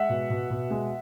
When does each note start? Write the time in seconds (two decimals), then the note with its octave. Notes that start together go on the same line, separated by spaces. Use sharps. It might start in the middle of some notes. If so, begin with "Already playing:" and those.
Already playing: G#3 E5 F#5
0.09 B2
0.30 B2
0.50 B2
0.71 G#3